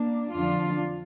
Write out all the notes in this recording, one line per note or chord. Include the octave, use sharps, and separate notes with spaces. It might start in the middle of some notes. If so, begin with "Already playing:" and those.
Already playing: A#3 D4
F2 D3 F3 D4 F4